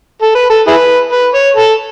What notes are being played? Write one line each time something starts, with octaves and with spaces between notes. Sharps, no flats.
A4
B4
A4
E4 G#4 B4
B4
C#5
A4